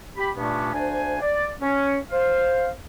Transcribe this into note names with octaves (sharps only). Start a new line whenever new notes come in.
G4 B5
G2 A#2 A3 B3 C#4 D4
D2 D4 C5 G#5
D5
C#4
C5 F5